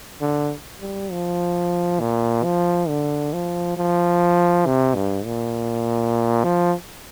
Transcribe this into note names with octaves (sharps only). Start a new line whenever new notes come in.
D3
G3
F3
A#2
F3
D3
F3
F3
C3
G2
A#2
F3